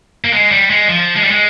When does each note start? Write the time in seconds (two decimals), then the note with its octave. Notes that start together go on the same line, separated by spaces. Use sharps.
0.24 A#3
0.33 G#3
0.51 G3
0.70 G#3
0.89 F3
1.16 G#3
1.24 G3
1.31 G#3